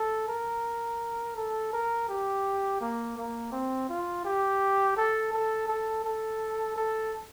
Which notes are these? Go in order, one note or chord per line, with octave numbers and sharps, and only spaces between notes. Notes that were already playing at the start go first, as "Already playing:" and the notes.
Already playing: A4
A#4
A4
A#4
G4
A#3
A#3
C4
F4
G4
A4
A4
A4
A4
A4